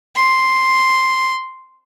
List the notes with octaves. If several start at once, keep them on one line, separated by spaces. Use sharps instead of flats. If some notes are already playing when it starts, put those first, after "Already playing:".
C6